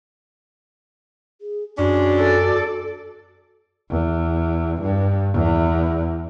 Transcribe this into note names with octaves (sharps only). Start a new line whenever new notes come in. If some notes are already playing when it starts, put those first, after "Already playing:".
G#4
F#2 G#3 C#4 D4 F#4
A4 D5
E2
G2
E2